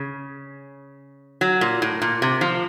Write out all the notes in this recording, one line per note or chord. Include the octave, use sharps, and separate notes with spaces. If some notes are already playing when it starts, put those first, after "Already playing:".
Already playing: C#3
F#3
A#2
A2
A#2
C3
F3